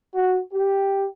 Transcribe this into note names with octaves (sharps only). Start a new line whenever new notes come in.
F#4
G4